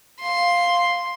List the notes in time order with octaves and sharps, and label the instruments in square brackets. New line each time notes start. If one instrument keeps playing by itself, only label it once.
[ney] F5 [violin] C6